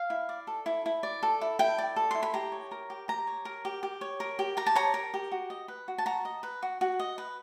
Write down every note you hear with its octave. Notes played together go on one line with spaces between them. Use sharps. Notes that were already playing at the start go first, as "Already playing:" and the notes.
Already playing: F5
E4
D5
A4
E4
E4
D5
A4
E4
E4 G5
D5
A4
E4 C6
B5
G4 A#5
C#5
A#4
G4
G4 A#5
C#5
A#4
G4
G4
C#5
A#4
G4
G4 A#5
A5
C#5 A#5
A#4
G4
F#4
D#5
B4
F#4
A5
F#4 A#5
D#5
B4
F#4
F#4
D#5
B4